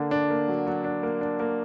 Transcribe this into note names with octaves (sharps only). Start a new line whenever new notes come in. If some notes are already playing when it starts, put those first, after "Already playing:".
Already playing: D3 A#3 D4
D4
A#3
F#3
F#3
D4
A#3
D4
A#3